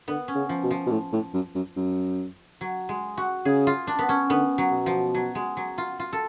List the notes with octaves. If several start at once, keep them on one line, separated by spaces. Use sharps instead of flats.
D3 B3
C#4
C#3
F3
B2
F3
B2
A2
A2
F#2
F#2
F#2
F#3
G#3
F#4
C#3 G#4
F4
D4
B3
C#4
D3 B3
F#3
B2
F3
F#3
G#3
F#3
F4
F4
A4